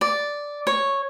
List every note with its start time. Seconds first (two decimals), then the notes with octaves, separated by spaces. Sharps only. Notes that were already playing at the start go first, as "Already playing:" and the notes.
0.01 D5
0.67 C#5